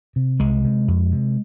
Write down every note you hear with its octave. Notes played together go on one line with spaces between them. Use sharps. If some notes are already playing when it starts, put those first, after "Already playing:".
C3
C2 G#3
C3
F2
C3